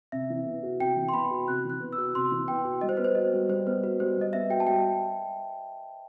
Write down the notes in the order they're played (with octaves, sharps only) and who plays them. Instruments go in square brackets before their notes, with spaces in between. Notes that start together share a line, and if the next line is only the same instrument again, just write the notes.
[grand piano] C3 [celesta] E5
[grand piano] E3
B3
F#4
[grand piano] C3 [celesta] G5
[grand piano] E3
[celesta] C6
[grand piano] B3 [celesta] B5
[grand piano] F#4
[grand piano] C3 [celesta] F#6
[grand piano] E3 [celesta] F#6
[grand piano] B3
[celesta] E6
[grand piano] F#4
[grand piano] C3 [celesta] C6
[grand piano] E3
[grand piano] B3 [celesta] G5
[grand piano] F#4
[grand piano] G3 [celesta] D#5
[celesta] C5
[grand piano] B3 [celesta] B4
[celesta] C5
[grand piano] F#4 [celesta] D#5
[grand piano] G3
[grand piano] G3 [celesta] C5
[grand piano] B3 [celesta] B4
[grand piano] F#4 [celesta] B4
[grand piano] G3 [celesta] C5
[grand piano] G3 [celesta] D#5
[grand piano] B3 [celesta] E5
[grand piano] F#4 [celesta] G5
[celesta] A5
[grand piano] G3 [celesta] G5